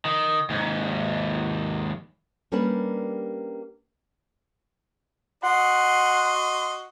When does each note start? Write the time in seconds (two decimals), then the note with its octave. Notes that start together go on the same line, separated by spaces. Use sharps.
0.05 D#3
0.50 D#2 G#2
2.52 G3 A#3 C#4 D4 G4 B4
5.44 F#4 D#5 F#5 C6